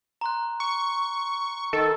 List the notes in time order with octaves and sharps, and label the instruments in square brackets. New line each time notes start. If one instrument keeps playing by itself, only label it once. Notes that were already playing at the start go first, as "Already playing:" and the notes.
[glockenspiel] A#5 C6 F#6
[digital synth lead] C#6
[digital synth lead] D#3 [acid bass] A4